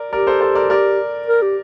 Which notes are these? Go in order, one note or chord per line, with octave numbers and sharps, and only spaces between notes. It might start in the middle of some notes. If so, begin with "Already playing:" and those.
Already playing: A#4 D5
G4 A#4 D5
A4 C5
A4 C5
A#4 D5
G4 A#4 D5
A#4
G4